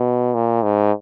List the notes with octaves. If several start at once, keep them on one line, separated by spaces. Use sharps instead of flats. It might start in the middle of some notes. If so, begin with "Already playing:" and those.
Already playing: B2
A#2
G#2